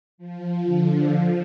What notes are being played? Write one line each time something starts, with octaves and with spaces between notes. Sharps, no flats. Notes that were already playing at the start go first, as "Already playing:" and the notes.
F3
D3
F3